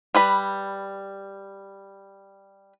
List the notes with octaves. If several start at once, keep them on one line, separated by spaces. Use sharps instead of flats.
G3 B4 B5